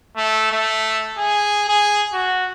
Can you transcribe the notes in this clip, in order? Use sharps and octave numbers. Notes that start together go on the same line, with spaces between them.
A3
A3
G#4
G#4
F#4